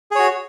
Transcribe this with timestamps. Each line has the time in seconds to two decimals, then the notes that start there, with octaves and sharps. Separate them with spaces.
0.11 G#4
0.15 C#5
0.19 F#4